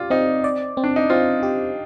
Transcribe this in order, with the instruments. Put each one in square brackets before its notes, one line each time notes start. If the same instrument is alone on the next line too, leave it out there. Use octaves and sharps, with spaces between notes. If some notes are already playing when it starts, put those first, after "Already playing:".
Already playing: [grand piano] F4 [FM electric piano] G4 D5
[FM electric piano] C4 [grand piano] D#4
[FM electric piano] D5
C4
[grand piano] D4
D#4
[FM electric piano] C4 [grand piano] F4
[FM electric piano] G4